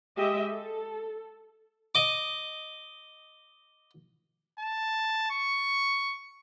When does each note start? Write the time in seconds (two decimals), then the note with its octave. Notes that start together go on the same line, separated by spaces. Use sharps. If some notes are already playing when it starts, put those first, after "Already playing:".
0.17 G#3 G4 D#5 E5
0.50 A4
1.95 D#5 D6
4.60 A5
5.31 C#6